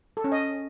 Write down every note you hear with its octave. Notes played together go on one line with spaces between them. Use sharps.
A4
C#4
D#5